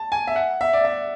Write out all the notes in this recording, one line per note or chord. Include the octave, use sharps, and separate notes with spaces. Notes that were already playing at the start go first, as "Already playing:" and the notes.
Already playing: A5
G#5
E5
F#5
E5
D5
E5